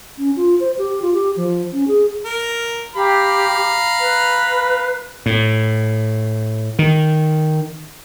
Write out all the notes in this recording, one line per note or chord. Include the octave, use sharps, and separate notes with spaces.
C#4
F4
C5
G4
F4
G4
F3
C#4
G#4
A#4
G4 F5 A#5 B5
B4
A2
D#3